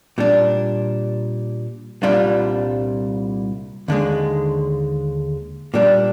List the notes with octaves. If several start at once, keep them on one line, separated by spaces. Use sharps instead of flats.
A#2 G3 D4
C2 A#2 G3 D4 F4
D#2 D3 G#3
A#2 G3 D4